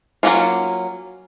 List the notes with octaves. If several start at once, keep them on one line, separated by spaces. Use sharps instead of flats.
F#3 G3 A#3 C#4 F4